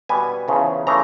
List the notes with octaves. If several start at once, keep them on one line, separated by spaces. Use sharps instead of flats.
B2 G3 B3 G#5
E2 C#3 F3
C#3 E3 A3 A#5